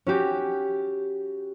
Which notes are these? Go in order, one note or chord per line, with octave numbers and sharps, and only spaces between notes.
C#4 F#4 G4